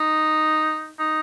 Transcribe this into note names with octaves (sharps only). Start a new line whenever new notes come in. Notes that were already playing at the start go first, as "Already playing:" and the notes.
Already playing: D#4
D#4